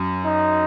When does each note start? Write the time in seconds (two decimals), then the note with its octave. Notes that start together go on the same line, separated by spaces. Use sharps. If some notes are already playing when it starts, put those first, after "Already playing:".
Already playing: F#2
0.25 D#4